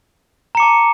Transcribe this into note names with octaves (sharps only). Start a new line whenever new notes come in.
A5 A#5 D6 C#7